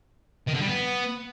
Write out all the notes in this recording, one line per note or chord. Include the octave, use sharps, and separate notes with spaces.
D#3
D3
G3
B3